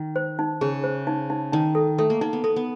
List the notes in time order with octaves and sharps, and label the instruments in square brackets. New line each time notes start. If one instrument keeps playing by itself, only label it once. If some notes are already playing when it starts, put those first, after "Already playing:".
Already playing: [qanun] D#3
[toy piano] C5
D#4
[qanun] C#3 [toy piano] G#4
[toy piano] C5
D#4
D#4
[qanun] D#3 [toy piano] D#4
[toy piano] A4
[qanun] A3 [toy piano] A4
[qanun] A#3
[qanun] A#3 [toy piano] D#4
[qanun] B3
[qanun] B3 [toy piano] A4
[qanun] B3